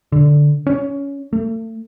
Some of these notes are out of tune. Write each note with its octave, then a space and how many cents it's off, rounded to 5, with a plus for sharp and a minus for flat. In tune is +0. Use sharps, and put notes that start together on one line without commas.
D3 -5
C#4 +15
A3 +35